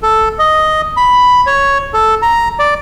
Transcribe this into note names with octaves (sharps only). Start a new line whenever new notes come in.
A4
D#5
B5
C#5
A4
A#5
D5